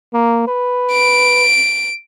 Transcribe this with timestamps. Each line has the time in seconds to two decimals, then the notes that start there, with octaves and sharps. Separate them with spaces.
0.13 A#3
0.47 B4
0.92 D7